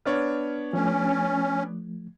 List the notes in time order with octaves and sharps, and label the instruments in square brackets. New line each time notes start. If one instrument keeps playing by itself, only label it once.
[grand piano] B3 D4 C#5 [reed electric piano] F6
[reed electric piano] F3 A3 [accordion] C#4